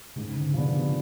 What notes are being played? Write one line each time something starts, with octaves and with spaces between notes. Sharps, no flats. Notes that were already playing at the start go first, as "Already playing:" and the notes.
G#2 C#3
D3
C3 F3 G#3 B3 D4
C#3